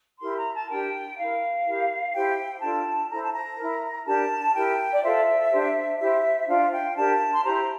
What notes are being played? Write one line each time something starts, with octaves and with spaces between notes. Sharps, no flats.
E4 G4 A#4 C6
A#5
A5
D4 G4 A#4 G5
E4 A#4 F5
E4 G4 A#4
E4 G4 C5 G5
D4 F4 A4 A5
E4 A4 C5 A#5
A5
A#5
E4 A#4
D4 G4 A#4 A5
E4 G4 A#4 G5
D5
F4 A4 C5 E5
D4 G4 C5
E4 G4 C5 E5
D4 F4 C5 F5
G5
D4 G4 A#4 A5
C6
E4 G4 C5 A#5